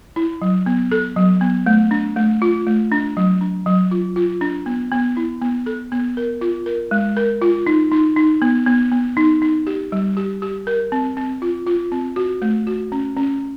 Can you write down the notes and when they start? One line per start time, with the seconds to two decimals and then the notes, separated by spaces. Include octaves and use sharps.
0.16 E4
0.42 F#3
0.66 B3
0.92 A4
1.16 F#3
1.41 B3
1.66 A3
1.91 D4
2.16 A3
2.42 F4
2.67 A3
2.92 D4
3.17 F#3
3.41 D4
3.66 F#3
3.91 F4
4.16 F4
4.41 D4
4.66 B3
4.92 B3
5.17 E4
5.42 B3
5.66 A4
5.92 B3
6.17 A#4
6.41 F4
6.66 A#4
6.91 G#3
7.17 A#4
7.42 F4
7.67 D#4
7.91 D#4
8.16 D#4
8.42 B3
8.67 B3
8.91 B3
9.17 D#4
9.42 D#4
9.67 G4
9.92 G3
10.17 G4
10.42 G4
10.67 A#4
10.92 C4
11.17 C4
11.42 F4
11.67 F4
11.92 C4
12.16 F#4
12.42 A3
12.67 F#4
12.92 C#4
13.16 C#4